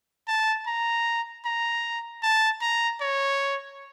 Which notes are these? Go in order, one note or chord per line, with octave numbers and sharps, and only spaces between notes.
A5
A#5
A#5
A5
A#5
C#5